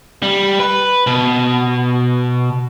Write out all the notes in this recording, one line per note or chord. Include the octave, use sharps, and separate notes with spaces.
G3
B4
B2